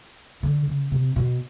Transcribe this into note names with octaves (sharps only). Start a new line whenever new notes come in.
D3
C#3
C3
B2